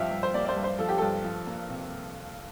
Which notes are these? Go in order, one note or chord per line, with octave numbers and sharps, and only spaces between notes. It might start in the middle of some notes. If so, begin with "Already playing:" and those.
Already playing: G2 F3 E5 F5 G5
G2
C5
A#3 D5
D5
C5
G2
C5
F3 A4
G4
G2 A4
F3
A#3
C3